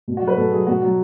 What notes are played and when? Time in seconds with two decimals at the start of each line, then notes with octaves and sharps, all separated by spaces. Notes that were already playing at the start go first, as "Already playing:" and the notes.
0.08 B2
0.17 F#4
0.22 F#3
0.27 B4
0.37 B2 A4
0.51 F#3 G#4
0.67 B2 F#4
0.82 F#3